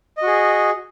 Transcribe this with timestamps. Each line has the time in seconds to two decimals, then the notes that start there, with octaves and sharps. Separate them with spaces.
0.17 D#5
0.22 F#4
0.27 G#4